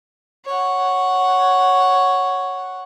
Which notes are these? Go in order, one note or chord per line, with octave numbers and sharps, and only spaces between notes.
C#5 F#5